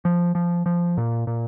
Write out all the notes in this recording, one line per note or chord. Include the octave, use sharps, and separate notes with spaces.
F3
F3
F3
A#2
A#2